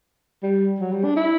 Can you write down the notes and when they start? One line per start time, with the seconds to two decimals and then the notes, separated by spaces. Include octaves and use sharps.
0.43 G3
0.80 F#3
0.92 G3
1.04 D4
1.16 E4